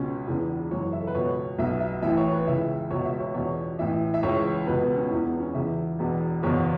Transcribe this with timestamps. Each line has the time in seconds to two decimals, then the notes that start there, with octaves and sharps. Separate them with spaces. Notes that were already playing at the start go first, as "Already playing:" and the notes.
Already playing: C#2 B2 C#4
0.27 E1 E2 C#3 E3
0.71 F#1 F#2 E3 C#5
0.93 E5
1.00 A4
1.07 B4
1.15 C#2 B2 C#5
1.59 B1 B2 E5
1.80 E5
2.02 A1 A2 E3 E5
2.17 C#5
2.32 B4
2.47 C#2 C#3 E3 E5
2.91 C#2 B2 C#5
3.05 E5
3.20 C#5
3.34 E1 E2 B2 C#5
3.78 A1 A2 E3 E5
4.14 E5
4.23 C#2 C#3 E3 C#5
4.66 C#2 B2 B4
4.82 B3
4.96 C#4
5.11 E1 E2 E3 E4
5.26 B3
5.40 C#4
5.55 E1 E2 C#3 E3 E5
5.99 E1 E2 B2
6.43 F#1 E2 B2 C#5